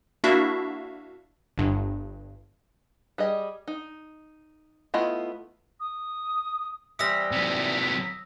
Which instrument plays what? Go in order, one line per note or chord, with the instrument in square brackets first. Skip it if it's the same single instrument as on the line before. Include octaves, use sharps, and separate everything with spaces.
[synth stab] A#3 D4 E4 F#4 E5 F5
G1 G2
[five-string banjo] G3 G#4 D#5
D#4
A3 B3 E4 F4 D#5
[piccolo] D#6
[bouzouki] E3 G3 C4 [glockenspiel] D#6 E6 A#6 [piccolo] B6
[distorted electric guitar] C3 F#3 [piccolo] B6